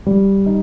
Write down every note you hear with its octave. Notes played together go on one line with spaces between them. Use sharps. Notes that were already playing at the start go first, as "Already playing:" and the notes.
G3
D#4